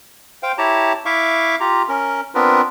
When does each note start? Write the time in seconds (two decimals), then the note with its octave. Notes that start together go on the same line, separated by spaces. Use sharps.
0.43 C5 F5 G5
0.58 E4 G4 C#5 A5 A#5
1.06 E4 E5 F5 C#6 D6
1.60 F4 G4 A#5
1.89 C#4 A#4
2.35 B3 C4 D4 F4 A#4 B4